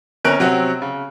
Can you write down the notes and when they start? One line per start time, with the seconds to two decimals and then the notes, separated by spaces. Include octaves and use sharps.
0.25 G1 C4 C#4 A#4 F#6 D7
0.39 C3 F#3 C4 F#4
0.82 C#3